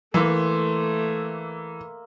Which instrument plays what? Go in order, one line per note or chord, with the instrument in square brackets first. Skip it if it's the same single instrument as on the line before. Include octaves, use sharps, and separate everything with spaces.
[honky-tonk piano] E3 [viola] A3 [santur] A#3 E5 C6